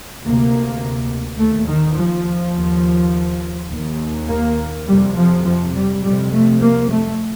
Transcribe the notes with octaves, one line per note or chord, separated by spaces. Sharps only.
D2 C3 A#3
D#2 A3
D#3
F3
D#2
D#2
A#3
F2 C3 G3
F3
F3
G3
F2 C3 G3
A3
A#3
A3